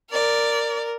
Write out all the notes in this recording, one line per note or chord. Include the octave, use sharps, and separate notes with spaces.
A#4 D5